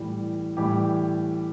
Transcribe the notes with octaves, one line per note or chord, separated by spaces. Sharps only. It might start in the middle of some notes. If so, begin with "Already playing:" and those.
Already playing: A2 E3 G3
A2 E3 G3 G4